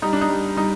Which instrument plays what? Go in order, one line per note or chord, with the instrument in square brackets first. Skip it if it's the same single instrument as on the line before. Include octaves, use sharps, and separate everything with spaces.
[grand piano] G3 [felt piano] D#4
[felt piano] D4
D#4
[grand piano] G3
[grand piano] G3 [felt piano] D#4